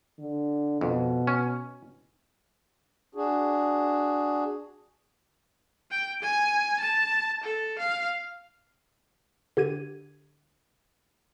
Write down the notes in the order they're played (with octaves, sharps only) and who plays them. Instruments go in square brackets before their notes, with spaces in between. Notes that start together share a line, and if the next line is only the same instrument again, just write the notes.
[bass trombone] D3
[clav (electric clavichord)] F2 [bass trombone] B2
[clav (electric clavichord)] C#4
[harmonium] D4 F#4 G#4
[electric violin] G5
G#5
A5
A4
F5
[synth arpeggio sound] D3 G4 G#6 D#7